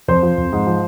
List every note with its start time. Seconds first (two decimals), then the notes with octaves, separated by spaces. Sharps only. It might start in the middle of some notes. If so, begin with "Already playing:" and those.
0.08 F2 C5
0.23 F3
0.38 F2
0.53 G#2
0.67 F3